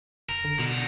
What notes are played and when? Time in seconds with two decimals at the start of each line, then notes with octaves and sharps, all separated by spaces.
0.29 F1 A#4
0.44 D3
0.59 B2 D3 A#4